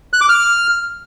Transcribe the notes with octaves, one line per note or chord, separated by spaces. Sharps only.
F#6
D6
F6